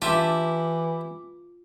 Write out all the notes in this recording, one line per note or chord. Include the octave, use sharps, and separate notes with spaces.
E3 E4 F4 G4 A5 D6